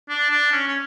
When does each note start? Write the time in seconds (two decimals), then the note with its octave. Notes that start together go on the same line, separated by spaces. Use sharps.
0.09 D4
0.31 D4
0.52 C#4
0.68 C#4